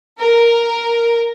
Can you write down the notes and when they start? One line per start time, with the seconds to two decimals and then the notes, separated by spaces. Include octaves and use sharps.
0.18 A#4